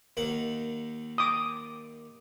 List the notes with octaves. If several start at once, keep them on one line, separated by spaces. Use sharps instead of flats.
D#2 D#3 F#5
D6 D#6